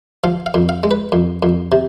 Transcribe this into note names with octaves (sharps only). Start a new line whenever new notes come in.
F3 F5
F5
F2
F5
G#3
B4
F2
F2
C3